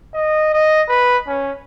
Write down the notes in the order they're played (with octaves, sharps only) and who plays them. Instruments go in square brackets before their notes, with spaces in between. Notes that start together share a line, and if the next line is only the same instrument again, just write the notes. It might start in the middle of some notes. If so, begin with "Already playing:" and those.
[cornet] D#5
D#5
B4
C#4